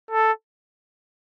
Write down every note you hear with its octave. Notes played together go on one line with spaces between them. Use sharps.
A4